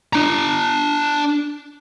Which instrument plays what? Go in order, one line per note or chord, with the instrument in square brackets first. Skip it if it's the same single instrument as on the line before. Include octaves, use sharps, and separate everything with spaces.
[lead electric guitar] D4 A#5